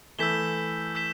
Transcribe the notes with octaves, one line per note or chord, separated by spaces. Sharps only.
E3 A3 E6 G6 B6 E7 G7
E6 G6 B6 E7 G7